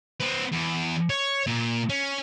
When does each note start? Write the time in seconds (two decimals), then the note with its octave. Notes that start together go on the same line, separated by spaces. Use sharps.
0.20 C4 B4
0.52 E2
1.10 C#5
1.47 A#2
1.89 C#4